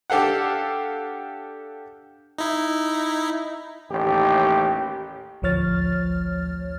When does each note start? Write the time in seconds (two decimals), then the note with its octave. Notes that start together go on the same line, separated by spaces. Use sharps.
0.10 D4 G4 A4 F5 F#5
2.38 D#4 E4
3.90 A1 D#2 G4
5.42 A1 D2 F3 C#5 F6 A6